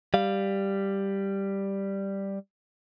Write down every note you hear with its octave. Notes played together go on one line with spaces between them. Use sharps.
G3 F5